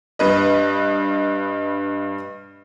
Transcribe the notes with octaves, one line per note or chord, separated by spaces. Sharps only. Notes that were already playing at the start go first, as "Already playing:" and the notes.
G2 B4 D#5